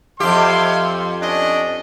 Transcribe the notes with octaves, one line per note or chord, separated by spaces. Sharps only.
F2 G4 E5 F5 C6
C#4 D4 D#5